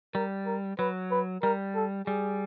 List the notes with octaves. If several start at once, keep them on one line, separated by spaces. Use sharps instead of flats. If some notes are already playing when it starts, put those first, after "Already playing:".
G3 A#4
A#4
F#3 B4
B4
G3 A#4
A4
G3 G#4